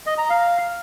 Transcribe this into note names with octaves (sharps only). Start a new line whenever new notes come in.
D#5
A#5
F5